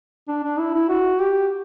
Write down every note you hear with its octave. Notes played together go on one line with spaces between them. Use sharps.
D4
D4
E4
E4
F#4
G4